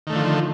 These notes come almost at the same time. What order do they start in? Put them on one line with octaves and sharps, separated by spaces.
D#3 A3 D3 F3